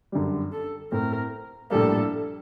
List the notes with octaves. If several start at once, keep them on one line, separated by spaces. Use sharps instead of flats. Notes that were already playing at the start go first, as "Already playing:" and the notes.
F#2 D3 G3
A4
A2 A3 C4 A#4
A#1 A2 G3 A#3 A4